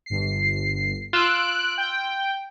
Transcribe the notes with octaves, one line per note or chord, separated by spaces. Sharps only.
G1 C7
F4 E6 F#6 D7
G5